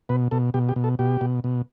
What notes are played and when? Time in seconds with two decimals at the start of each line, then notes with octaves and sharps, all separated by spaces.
0.09 B2 B4
0.31 B2 A4
0.54 B2 G4
0.69 G4
0.76 B2
0.84 A4
0.99 B2 G4
1.21 B2
1.44 B2